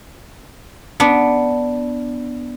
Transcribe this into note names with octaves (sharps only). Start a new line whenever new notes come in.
B3 D4